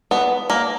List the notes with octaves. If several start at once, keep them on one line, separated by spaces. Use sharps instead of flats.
B3
A#3